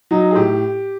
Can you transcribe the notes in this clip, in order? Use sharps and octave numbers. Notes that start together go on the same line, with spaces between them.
F#3 D#4
G#4
A2 G4